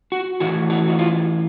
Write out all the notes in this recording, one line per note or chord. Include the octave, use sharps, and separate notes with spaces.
F#4
A2 E3 F#4
F#4
F#4
F4